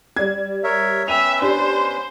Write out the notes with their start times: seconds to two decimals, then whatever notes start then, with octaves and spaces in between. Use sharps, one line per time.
0.16 G3 D5 G#6
0.64 A#4 C#5 E5
1.08 B3 C#4 B4 E5 G5 D#7 F7
1.42 D4 G4 C5 D5